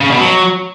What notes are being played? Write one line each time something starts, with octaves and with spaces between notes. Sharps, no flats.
C#3
B2
F#3